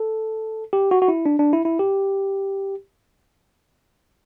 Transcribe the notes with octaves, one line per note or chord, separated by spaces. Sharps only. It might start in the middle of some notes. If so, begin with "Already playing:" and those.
Already playing: A4
G4
F#4
F#4
E4
D4
D4
E4
E4
G4